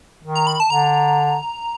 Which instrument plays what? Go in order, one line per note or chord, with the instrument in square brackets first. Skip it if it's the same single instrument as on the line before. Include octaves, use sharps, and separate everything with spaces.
[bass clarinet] D#3
[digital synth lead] A#5
B5
A5
[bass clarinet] D3 [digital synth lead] A#5